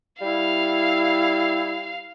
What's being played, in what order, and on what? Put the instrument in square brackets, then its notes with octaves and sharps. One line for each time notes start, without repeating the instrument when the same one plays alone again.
[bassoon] G3 [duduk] E4 [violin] F5